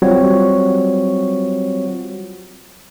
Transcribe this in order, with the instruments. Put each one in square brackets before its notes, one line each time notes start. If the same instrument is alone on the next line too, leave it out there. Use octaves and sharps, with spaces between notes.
[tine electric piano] F#3 G3 C4 F4 F#4 C#5